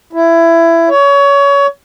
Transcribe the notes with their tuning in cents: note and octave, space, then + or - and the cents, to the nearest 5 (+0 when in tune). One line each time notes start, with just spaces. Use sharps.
E4 +20
C#5 +25